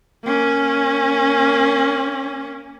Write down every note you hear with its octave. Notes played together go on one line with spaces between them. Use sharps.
A#3 C#4